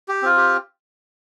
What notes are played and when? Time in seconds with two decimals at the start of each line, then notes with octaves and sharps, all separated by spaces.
0.08 G4
0.22 C4 F4
0.37 G4